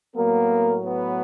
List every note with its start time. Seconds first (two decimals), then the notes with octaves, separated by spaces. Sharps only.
0.15 A2 F#3 A#3 B3 A#4
0.85 B3 B4